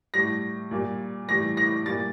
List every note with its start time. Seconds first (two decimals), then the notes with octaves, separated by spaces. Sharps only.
0.14 A2 G3 A#6
0.71 A#2 G3
1.29 A2 E3 G3 A#6
1.57 A#6
1.86 G3 A6
1.89 A#2